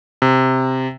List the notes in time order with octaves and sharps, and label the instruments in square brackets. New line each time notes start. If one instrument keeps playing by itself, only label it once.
[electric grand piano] C3